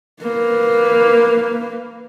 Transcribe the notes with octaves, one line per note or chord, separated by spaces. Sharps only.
A#3 B4